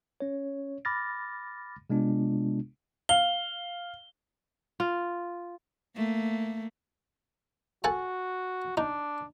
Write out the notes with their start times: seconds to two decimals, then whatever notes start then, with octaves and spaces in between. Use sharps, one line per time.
0.20 C#4 C#5
0.85 B5 D6 F6 A6 A#6
1.90 C3 G#3 B3 D4 F4
3.09 F5 G7
4.80 F4
5.96 A3 A#3
7.84 F#4 A4 F#5 G#5
8.77 D4 D#4